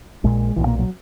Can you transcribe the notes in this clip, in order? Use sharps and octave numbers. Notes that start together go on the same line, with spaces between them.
A#1 A#2 G#3
B1 A#2 E3
A#3
F#3